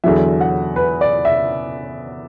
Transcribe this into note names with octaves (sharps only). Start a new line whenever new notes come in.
E2 D3 F#3 E5
F#5
B4
D5
E5